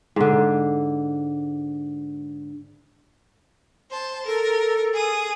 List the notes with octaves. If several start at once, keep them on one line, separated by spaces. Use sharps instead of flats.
G#2 D3
C5 A5
A4 A#4
G#4 D#6